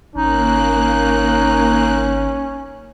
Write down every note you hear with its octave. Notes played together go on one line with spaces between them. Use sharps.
G#1 A#3 C#4 D#4 F#6